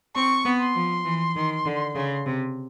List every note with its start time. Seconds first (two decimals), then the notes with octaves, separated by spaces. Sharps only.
0.15 C4 C#6
0.45 B3
0.60 C6
0.75 F3
1.05 E3
1.36 D#3
1.65 D3
1.95 C#3
2.26 C3